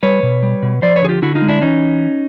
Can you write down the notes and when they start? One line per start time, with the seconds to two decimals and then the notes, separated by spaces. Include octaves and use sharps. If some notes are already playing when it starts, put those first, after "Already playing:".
0.03 G3 B4 C#5
0.23 B2
0.43 G3
0.63 B2
0.82 F3 C5 D5
0.96 B4 C#5
1.02 D3 G#4
1.09 F4 G4
1.22 D3 E4 F#4
1.35 D#4 F4
1.42 G#3
1.48 D4 E4
1.61 E3 C#4 D#4